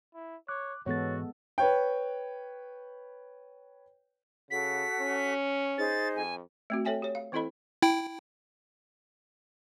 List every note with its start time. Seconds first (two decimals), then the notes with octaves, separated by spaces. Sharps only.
0.14 E4
0.48 C#5 D6 F#6
0.86 G#2 E3 G#3 B3 F#4 A4 C#5 A6
1.58 B4 C#5 G5
4.51 C#3 F#4 A4 F#5 B6
4.99 C#4
5.78 D#4 G#4 C5 A6
6.16 F2 G#5
6.70 A3 C4 F#4
6.85 A4 C#5 E5 G5 G#5
7.02 G4 C#5
7.15 F5
7.32 E3 C4 E4 A4 D#5 B5
7.82 E4 G5